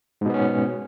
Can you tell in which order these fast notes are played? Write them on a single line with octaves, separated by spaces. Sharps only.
G#2 B2 B3 C#4